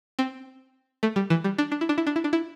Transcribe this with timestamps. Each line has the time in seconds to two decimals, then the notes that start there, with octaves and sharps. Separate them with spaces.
0.19 C4
1.03 A3
1.16 G3
1.30 E3
1.44 G3
1.58 D4
1.72 D4
1.81 E4
1.89 D4
1.98 E4
2.07 D4
2.16 E4
2.24 D4
2.33 E4